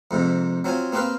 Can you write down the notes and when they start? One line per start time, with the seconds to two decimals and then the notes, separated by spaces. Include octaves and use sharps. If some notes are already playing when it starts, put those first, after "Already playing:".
0.11 F2 G#2 C3
0.64 F#3 C4 F4 G#5
0.92 A#3 C4 G4 B4 F5